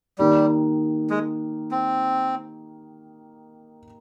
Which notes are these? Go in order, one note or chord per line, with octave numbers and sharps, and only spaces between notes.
D#3 G3 A#3 D#4 G4
G#3
C4